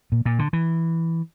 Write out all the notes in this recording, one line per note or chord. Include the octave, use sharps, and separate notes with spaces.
A#2
A#2
D3
E3